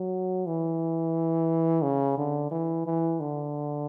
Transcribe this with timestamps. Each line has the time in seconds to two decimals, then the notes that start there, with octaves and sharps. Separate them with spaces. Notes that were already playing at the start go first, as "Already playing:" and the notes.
Already playing: F#3
0.46 E3
1.83 C#3
2.18 D3
2.51 E3
2.86 E3
3.20 D3